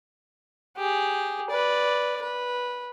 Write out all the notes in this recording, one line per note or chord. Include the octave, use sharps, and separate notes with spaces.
G4 G#4
B4 D5
B4